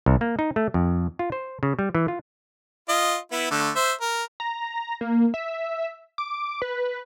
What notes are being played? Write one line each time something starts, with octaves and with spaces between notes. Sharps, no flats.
C2
A#3
D#4
A3
F2
F4
C5
C#3
G3
E3
F4
F4 D#5
B3 E4
D3 A3
C5 E5
A#4
A#5
A#3
E5
D6
B4